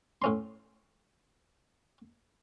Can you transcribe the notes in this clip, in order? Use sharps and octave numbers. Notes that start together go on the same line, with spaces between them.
A2 C#4 C6